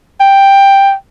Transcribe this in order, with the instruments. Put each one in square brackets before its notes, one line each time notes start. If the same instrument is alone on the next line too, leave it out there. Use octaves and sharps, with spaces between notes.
[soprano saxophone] G5